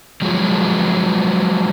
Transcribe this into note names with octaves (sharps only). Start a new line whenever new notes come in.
F3 F#3 G#3